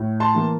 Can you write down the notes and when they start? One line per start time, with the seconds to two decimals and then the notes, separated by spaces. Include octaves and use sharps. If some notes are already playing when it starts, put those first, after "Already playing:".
Already playing: A2
0.20 A5 C6
0.35 E3 A#3